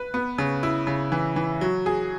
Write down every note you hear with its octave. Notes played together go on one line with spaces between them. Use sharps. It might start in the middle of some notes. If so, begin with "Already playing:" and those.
Already playing: B4
B3
C#3
E4
C#3
E3
E3
F#3
G#4